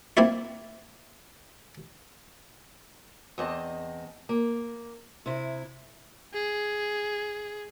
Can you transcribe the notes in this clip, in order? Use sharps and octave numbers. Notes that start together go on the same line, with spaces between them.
A#3 C4 E4 F4
E2 C4 D#5 A5
A#3
C3 E4
G#4